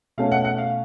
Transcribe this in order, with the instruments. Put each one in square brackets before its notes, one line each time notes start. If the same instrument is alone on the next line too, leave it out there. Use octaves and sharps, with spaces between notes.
[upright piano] B2 A3 C#4 F5
F#5
F#5
F5